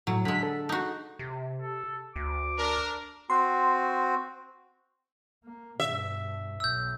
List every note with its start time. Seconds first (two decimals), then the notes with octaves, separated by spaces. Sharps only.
0.07 A2 F#3
0.25 D3 G#3 B6
0.43 A4
0.69 D#4 F#4
1.19 C3
1.61 A4
2.16 D2 D6
2.57 D4 A#4
3.30 C4 F#4 C6
5.44 A#3
5.80 G2 B2 E5
6.60 B1 E6 G6